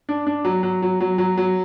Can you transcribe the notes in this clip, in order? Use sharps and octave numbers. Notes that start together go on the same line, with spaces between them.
D4
D4
F#3
F#3
F#3
F#3
F#3
F#3